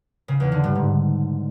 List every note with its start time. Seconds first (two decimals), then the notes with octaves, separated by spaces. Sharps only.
0.28 C#3
0.40 E2
0.52 D3
0.64 G2
0.75 G#2